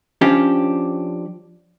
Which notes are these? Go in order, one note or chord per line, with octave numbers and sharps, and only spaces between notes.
F3 C#4 D4 G4